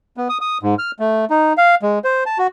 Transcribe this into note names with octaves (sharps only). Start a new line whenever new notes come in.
B3
D#6
D#6
G#2
F6
A3
D#4
F5
G#3
C5
A5
F#4